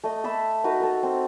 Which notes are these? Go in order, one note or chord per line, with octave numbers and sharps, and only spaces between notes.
A3 D#5
A4 E5 B5 E6
D#4 F#4 A#4 B4
A4 A#4
C4